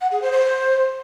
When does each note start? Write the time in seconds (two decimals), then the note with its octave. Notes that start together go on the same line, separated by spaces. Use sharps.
0.01 F#5
0.11 G#4
0.22 C5
0.32 C5